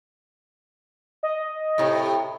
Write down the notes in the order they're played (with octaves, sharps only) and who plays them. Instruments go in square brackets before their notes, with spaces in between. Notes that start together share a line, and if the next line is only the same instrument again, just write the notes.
[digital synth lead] D#5
[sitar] A2 C3